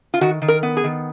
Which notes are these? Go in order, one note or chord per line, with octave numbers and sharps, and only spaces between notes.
F4
D#3 F#4
D#3
A#4
B3
G#4
D#3